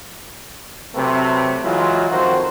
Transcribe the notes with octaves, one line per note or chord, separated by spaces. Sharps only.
C3 F#3 A3 C4 B4
E3 F#3 G#3 E4 F4
F2 D#3 F#3 F#4 C5